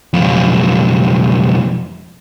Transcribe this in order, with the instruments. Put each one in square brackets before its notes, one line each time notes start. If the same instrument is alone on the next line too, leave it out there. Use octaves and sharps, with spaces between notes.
[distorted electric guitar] B1 F2